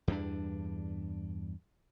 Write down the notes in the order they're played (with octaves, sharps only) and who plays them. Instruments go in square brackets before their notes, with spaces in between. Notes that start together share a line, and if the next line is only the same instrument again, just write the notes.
[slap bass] E2 G2 D4